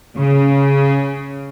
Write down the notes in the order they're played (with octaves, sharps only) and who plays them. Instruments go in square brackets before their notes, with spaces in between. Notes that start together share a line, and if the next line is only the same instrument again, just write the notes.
[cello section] C#3